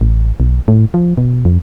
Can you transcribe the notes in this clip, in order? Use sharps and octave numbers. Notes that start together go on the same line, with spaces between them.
A1
B1
A2
F3
B2
F2